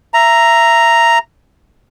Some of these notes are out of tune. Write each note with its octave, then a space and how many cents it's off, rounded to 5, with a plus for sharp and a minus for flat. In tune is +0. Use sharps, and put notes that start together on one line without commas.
E5 +20 A#5 +0